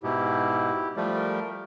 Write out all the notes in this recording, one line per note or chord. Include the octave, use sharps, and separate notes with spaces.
G#2 B2 E4 G4
F3 G3 A3
A#4